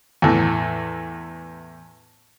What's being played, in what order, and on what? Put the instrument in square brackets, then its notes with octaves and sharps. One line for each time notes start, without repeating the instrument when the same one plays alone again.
[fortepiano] E2 A2